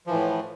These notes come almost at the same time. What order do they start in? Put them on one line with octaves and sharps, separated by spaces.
F3 E3 A2